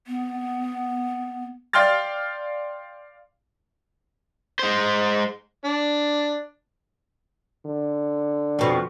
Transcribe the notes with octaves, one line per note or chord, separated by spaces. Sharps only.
B3
D5 F5 G5 C6 F6 A6
G#3 C5
D4
D3
F2 B2 F3